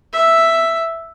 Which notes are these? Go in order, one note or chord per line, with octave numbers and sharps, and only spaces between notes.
E5